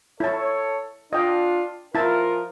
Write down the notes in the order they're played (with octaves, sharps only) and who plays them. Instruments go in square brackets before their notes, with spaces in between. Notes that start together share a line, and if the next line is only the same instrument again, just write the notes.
[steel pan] E4 A5 [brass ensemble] A4 C#5
[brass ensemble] D4 F4 [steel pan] D#5 G5
[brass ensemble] F3 F4 A#4 [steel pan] E4 A5